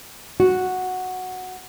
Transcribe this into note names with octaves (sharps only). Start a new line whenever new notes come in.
F#4